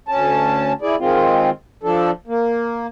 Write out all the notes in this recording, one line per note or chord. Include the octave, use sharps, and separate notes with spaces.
D2 C#4 A5
E4 G#4 D5
D#3 G#3 C4 F4
F3 D4 A4
A#3